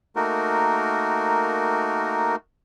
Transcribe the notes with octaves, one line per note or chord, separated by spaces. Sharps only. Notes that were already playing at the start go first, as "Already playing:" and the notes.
A3 A#3 D#4 F#4 A#4